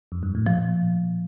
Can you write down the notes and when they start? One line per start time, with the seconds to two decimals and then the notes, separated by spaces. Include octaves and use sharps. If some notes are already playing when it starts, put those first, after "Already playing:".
0.12 F2
0.23 G2
0.35 A2
0.46 A#2 F3